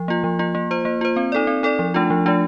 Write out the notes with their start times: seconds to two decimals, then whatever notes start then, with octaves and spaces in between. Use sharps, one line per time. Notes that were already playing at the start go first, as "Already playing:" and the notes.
Already playing: F3
0.08 A#3 F4
0.24 F3
0.39 A#3 F4
0.55 A#3
0.71 F4 C5
0.85 A#3
1.01 F4 C5
1.16 C4
1.32 D#4 A4 D5
1.47 C4
1.63 D#4 A4 D5
1.79 F3
1.94 A3 D4 F4
2.10 F3
2.26 A3 D4 F4